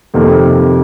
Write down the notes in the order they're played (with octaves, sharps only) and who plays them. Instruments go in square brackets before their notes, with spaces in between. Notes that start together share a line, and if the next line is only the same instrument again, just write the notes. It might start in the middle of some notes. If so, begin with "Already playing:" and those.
[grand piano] F2 C3 D#3 A#3